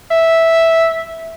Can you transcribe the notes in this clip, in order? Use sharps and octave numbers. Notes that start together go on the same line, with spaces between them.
E5